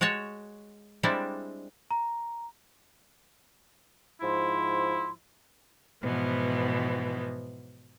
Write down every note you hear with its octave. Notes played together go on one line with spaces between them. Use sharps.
G#3 F#4 C#5 A5
G3 G#3 C4 D4 E4
A#5
G#2 F3 E4 C6
G#2 B2 E3 F3 B3